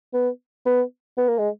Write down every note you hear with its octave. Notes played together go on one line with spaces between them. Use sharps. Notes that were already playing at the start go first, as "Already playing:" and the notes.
B3
B3
B3
A#3
G#3